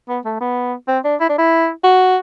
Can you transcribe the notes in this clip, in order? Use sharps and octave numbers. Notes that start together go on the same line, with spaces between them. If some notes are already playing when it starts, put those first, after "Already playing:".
B3
A3
B3
C4
D4
E4
D4
E4
F#4